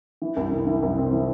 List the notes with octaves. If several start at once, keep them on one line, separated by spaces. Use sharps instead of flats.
E3
C2
E3
E3
C2
C4
E3